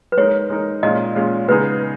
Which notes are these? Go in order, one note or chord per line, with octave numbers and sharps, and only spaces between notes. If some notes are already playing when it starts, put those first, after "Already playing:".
B4
G#3 D#4 A#4 C#5
G#3 D#4 A#4
A#2 G#3 C#4 F4 D#5
A#2 G#3 C#4 F4
C#3 G#3 B3 D#4 G#4 B4